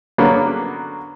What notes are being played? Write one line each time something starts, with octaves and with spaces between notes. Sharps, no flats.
D3 F#3 A#3 B3 C#4 D4